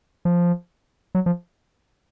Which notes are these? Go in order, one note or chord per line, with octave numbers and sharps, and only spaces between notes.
F3
F#3
F3